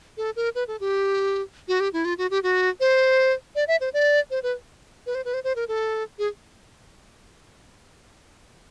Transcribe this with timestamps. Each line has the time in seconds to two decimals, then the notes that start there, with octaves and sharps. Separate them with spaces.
0.17 A4
0.36 A#4
0.55 B4
0.68 A4
0.80 G4
1.68 F#4
1.80 G4
1.93 E4
2.05 F4
2.18 F#4
2.31 G4
2.43 F#4
2.80 C5
3.55 D5
3.68 E5
3.81 C5
3.94 D5
4.31 C5
4.43 B4
5.06 B4
5.15 C5
5.25 B4
5.34 C5
5.44 C5
5.56 A#4
5.68 A4
6.19 G#4